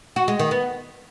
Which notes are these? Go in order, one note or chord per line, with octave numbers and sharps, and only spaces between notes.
F#4
G#3
D#3
B3